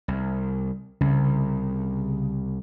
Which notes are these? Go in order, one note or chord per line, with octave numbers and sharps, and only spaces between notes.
C2
C2 C#3